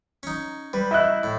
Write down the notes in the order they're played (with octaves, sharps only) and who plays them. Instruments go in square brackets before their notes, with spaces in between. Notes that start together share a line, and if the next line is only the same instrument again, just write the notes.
[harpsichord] C#4 D#4
[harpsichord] G3 [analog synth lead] B4
[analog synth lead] E4 [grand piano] D#5 E5 F#6
[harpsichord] A2